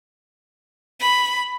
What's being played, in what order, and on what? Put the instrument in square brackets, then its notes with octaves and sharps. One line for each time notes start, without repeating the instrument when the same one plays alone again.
[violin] B5